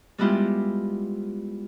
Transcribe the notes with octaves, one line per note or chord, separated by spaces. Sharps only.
G3 G#3 B3 E4 F4 G4